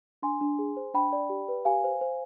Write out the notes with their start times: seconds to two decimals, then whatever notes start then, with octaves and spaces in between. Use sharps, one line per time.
0.22 D4 G#5 C6
0.41 D4
0.59 G#4
0.77 C5
0.94 D4 G5 B5
1.13 D5
1.29 G4
1.48 B4
1.65 G4 F5 G#5
1.84 C5
2.01 C5